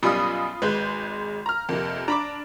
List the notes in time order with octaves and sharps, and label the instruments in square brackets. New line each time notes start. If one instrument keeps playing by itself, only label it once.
[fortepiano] F#2 B2 G3 [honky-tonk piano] F4 B5 D#6
[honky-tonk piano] G#1 G#3 G6 [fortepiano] B4
[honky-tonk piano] A#5 F6
[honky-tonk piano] F2 C3 [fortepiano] A#3
[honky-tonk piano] D4 [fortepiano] A#5 B5 D6